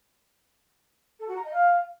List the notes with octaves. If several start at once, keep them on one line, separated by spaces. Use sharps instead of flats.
A4
F#4
A#5
D#5
F5